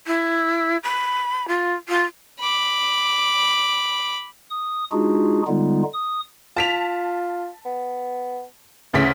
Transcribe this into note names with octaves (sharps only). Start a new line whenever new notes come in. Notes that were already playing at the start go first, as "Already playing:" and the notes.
E4
B5
F4
F4
B5 D6
D#6
G#3 D4 D#4 F4 F#4 G#4
D3 G3 G#3 B3 D#4 F4
D#6
F4 A5 B6 F7
B3
D2 C#3 E3 B6